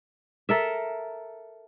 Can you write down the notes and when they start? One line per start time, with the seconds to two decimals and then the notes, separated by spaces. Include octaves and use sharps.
0.49 A4 A#4 E5